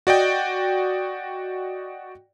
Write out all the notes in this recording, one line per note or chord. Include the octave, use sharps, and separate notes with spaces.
F#4 D5 D#5 G5